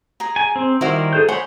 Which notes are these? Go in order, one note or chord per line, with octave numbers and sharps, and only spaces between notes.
G#4 A#5
G#5
C4
D#3 G3 E4 F#4 A#4 C5
G#4 A4 G6
C5 C#5 F#5 G#5 B5